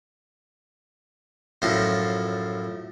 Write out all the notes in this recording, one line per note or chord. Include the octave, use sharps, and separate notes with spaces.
F#2 A2 F3 A4 C6